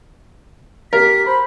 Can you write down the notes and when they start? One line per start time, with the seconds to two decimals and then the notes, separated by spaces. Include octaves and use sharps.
0.93 G4 A#4 B6
1.26 C5 B5